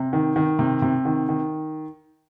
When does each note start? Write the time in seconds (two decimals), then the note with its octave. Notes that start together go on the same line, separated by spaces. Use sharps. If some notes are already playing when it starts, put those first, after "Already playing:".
Already playing: C3
0.13 D#3
0.36 D#3
0.59 C3
0.82 C3
1.05 D#3
1.29 D#3